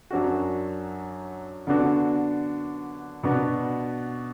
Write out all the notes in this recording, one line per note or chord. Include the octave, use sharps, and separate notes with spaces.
F#2 F#3 D4 F#4
D3 B3 D4 F#4
B2 B3 D4 F#4